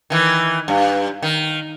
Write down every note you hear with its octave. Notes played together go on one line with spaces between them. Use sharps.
D#3 E3
G2
D#3